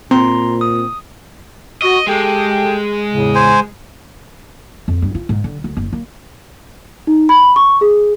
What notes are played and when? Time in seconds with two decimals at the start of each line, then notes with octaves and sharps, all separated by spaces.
0.11 A#2 C4 A#5 C6
0.61 D#6
1.82 F#4 D#5
2.07 G#3 G4 A4 G5
3.10 E2 A2 C#3
3.35 C5 G#5
4.88 F2
5.02 G2
5.15 F4
5.29 G#2
5.44 D3
5.64 D2
5.77 F#1
5.93 A#3
7.07 D#4
7.29 B5
7.56 C#6
7.81 G#4